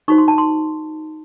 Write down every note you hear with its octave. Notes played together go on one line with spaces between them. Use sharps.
D#4 F#4 C5 C#6
C6
A5
C6